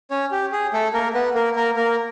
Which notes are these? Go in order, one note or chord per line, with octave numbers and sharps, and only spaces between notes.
C#4 C#5
G4
G#4
A3 A4
A#3 A#4
B3 B4
A#3 A#4
A#3 A#4
A#3 A#4